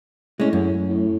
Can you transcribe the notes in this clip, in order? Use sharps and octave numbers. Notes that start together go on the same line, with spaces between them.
A2 G#3 C#4
F#2
A2